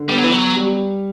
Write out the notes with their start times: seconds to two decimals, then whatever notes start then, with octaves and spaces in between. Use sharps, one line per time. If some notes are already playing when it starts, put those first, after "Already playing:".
Already playing: D3
0.09 G3 B3
0.18 F#3
0.24 E3
0.32 F#3
0.57 G3